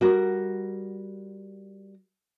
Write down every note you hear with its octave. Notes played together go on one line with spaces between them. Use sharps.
G3 F#4 A#4